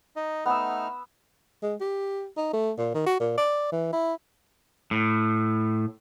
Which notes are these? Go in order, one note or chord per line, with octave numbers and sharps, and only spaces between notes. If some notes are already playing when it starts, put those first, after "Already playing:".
D#4 D#5
A3 B3 D#4 E6 F6
G#3
G4
D#4
A3
A#2
D#3
F#4
A#2
D5
E3
E4
A2